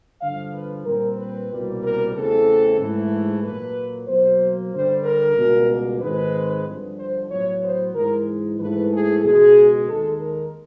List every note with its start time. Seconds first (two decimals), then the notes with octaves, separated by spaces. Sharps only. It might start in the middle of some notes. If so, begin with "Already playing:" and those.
0.21 G2 D3 F3 F5
0.54 B4
0.86 A#2 G3 C4 A#4
1.18 B4
1.50 C2 B2 G3 A#3
1.82 A#4
2.14 E2 C#3 E3 A3 C4 A4
2.79 G#2 E3 A3
3.43 A#2 F#3 A#3 B4
4.07 B2 F#3 A#3 C5
4.72 G2 D3 G3 C5
5.05 A#4
5.36 C#2 B2 G3 A#3
6.01 G#2 D#3 G#3 C4 B4
6.66 G2 D3 F3
6.98 C5
7.30 A2 F#3 B3 C#5
7.63 C5
7.95 G#2 E3 G#3 A#4
8.59 G#2 E3 A3 B4
8.92 G#4
9.23 C#2 B2 G#3 G#4
9.88 D#2 D#3 G#3 A4
10.20 A#4